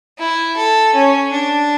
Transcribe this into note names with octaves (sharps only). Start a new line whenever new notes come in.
E4
A4
C#4
D4